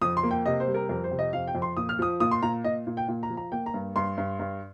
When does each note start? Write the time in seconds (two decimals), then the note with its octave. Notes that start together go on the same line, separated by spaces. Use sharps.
0.01 F2 D#6
0.17 C6
0.23 A#3
0.31 G5
0.46 C3 D#5
0.60 C5
0.67 G3
0.74 A#4
0.89 F2 A#4
1.04 C5
1.11 C3
1.19 D#5
1.33 F2 F5
1.48 G5
1.55 F2
1.62 C6
1.77 A#2 D#6
1.89 F6
1.99 F3 D#6
2.20 A#2 D#6
2.31 C6
2.43 A#2 A#5
2.64 A#2 D#5
2.87 A#2
2.97 G5
3.08 A#2
3.23 A#5
3.30 F3
3.37 A#5
3.52 A#3 G5
3.66 A#5
3.74 G2
3.96 G2 C6
4.18 G2
4.39 G2